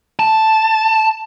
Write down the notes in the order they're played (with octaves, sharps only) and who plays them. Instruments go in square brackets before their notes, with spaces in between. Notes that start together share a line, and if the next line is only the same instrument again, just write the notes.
[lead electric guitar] A5